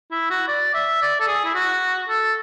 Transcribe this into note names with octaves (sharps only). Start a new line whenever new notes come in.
E4
F#4
D5
E5
D5
A4
G#4
E4
F#4
A4